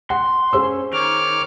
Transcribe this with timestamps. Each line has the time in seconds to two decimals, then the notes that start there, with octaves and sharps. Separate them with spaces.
0.10 F#5 C6
0.53 C#4 G#4 C5 E6
0.93 D#3 C#5 D6 F6